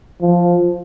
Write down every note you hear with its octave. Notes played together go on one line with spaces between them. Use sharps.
F3